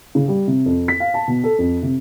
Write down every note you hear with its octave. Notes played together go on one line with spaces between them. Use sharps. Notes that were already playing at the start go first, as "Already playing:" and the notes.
C#3
G3
C3
F2
B6
F5
A5
B2
A4
F2
C3